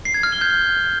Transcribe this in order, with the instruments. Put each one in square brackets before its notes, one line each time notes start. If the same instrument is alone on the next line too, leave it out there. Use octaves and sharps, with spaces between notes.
[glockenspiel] C7
G#6
F6
G7
G6